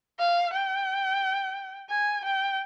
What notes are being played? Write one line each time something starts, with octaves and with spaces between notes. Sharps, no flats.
F5
G5
G#5
G5